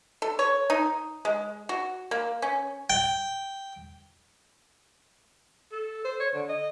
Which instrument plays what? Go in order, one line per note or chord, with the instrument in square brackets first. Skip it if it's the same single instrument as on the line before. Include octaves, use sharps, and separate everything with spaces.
[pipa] A4
C#5
D#4
G#3
F#4
A#3
C#4
[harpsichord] G5
[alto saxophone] A4
C5
C#5
D3
D#5